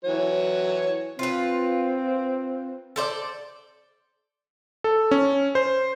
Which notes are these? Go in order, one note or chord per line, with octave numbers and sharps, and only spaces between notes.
E3 F#3 C#5
C4 F4 B4
A4 C5 D5
A4
C#4
C5